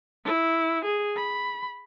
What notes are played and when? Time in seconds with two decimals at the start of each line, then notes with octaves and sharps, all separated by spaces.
0.25 E4
0.85 G#4
1.16 B5